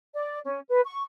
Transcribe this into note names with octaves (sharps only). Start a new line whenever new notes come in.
D5
C#4
B4
C#6